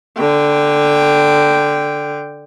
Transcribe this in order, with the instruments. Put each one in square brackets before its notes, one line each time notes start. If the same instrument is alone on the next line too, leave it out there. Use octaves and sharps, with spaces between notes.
[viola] D3 G5